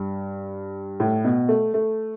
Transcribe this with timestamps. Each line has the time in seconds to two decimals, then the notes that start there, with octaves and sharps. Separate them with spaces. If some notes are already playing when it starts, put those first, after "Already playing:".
Already playing: G2
1.00 A2
1.25 B2
1.49 A3
1.74 A3